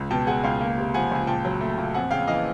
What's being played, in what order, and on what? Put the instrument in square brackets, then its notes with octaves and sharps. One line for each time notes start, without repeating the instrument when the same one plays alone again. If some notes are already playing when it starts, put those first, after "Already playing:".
Already playing: [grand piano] C#2
B2 G5 A5
G#3 F#5 G#5
C#2 F5 G5
A#3
C3
F3 F#5 G#5
C#2 G#5
A#2 G5 A5
F#3
A3
A#2
F2 F#5 G#5
C#3 F5 G5
E3 D#5 F5